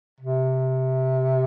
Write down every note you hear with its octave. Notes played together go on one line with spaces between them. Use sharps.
C3